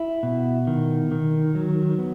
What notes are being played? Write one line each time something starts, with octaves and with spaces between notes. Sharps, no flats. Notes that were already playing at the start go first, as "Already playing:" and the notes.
Already playing: E4
B2
D#3
D#3
F#3
B3